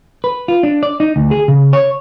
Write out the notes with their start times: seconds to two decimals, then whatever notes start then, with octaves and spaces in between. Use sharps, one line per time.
0.24 B4
0.48 F4
0.63 D4
0.83 D5
1.00 D#4
1.16 D2
1.31 G#4
1.48 C#3
1.73 C#5